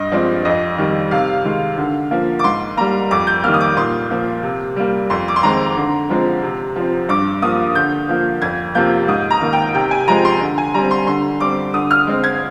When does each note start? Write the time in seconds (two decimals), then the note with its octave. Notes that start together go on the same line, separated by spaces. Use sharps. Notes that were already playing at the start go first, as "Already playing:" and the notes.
Already playing: G2 D#5
0.12 F3 G#3 C4 D5
0.45 F2 D#5
0.78 D#3 G3
1.11 C3 F5
1.45 D#3 G#3
1.77 D3
2.11 F3 A#3
2.39 D6
2.44 G#2 C6
2.77 G3 A#3 A#5
3.11 F2 D6
3.27 G6
3.44 D#3 G3 A#3 F6
3.54 D#6
3.61 D6
3.77 A#2 C6
4.10 F3 A#3
4.43 C3
4.76 G3 A#3
5.10 F2 C6
5.28 D6
5.36 C6
5.43 D#3 G#3 C4 A#5
5.76 D3
6.10 F3 G#3 C4
6.43 C3
6.76 F3 C4
7.09 G2 D6
7.42 F3 A#3 D#6
7.75 D3 G6
8.08 F3 A#3
8.42 F2 G#6
8.75 C3 F3 A#3 G6
9.08 G#2 D#6
9.31 A#5
9.41 D#3 A#3
9.53 G5
9.75 C3 G5
9.91 G#5
10.07 F3 G#3 C4 A#5
10.25 C6
10.41 D3
10.58 G#5
10.74 G3 C4 A#5
10.91 C6
11.07 D3 C6
11.40 G3 C4 D6
11.74 D3 D#6
11.91 F6
12.07 G#3 C4
12.24 G#6